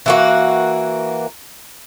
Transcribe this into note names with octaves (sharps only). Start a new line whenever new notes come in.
E3 A#3 F#4